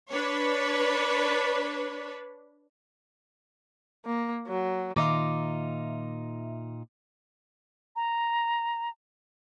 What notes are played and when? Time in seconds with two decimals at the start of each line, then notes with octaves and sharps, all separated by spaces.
0.11 D4 B4 C#5
4.06 A#3
4.48 F#3
4.96 A#2 D#3 D#4 F4 E5 C6 D6
7.96 A#5